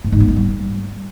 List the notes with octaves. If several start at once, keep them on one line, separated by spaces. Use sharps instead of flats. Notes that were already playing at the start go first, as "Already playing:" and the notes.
A2
G#2
B3
G#3
G3